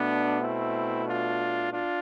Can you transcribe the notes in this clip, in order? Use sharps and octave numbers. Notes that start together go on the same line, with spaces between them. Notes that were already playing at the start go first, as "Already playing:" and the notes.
Already playing: B2 A3 B3 D4
C4 E4
D4 F4
D4 F4